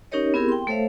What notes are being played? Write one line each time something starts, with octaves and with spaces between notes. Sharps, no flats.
C#4 D#4 G4 A#4 C#5 D#5
B3 C4 E4 G4 G#4 A#4
G5 C6
A3 A4 C5 C#5 E5 F5